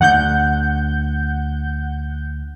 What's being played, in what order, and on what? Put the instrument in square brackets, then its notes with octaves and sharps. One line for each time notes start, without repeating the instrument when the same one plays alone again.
[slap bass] D2 [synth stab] F#5 G6